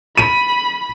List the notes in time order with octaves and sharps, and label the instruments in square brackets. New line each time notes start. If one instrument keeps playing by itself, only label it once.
[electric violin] B5 [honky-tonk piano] D#7